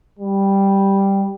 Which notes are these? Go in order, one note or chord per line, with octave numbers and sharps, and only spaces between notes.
G3